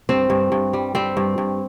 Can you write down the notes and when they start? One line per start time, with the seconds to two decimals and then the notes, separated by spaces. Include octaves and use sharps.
0.09 G2 C4
0.30 G2
0.52 G2
0.73 G3
0.95 G3 C4
1.17 G2
1.38 G2